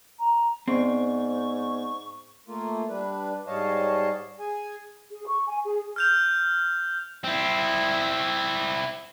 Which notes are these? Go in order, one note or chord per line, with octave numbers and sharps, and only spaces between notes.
A#5
G#2 B3 C4 D5 C#6
A3 A#3 F4
G3 D4 B4
G#2 G3 C#5 D#5 F5 A5
G#4 G#5
G#4
C#6
G#5
G#4
F6 G6 F7
C4 E4